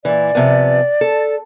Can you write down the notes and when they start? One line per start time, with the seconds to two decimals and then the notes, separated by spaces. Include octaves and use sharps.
0.05 A#2 E3 D5
0.35 C3 F3 B3
1.01 A4